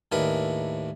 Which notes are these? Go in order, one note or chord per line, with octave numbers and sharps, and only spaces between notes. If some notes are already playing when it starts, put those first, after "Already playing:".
D#2 A2 D4 A#4 B4 G#5